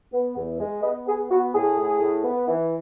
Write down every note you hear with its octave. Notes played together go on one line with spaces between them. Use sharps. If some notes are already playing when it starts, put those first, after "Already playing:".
B3
E2
G#3
B3 B4 D#5
B3 G#4
B3 F#4
A2 G#4
A2
A2
B3
E3